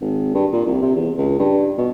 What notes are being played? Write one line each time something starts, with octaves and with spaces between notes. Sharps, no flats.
G#1
G2
A#2
C2
C3
E2
C#2
G2
B2